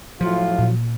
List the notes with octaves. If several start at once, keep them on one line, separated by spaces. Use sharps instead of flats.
A2 F3 F#3 F4
A#2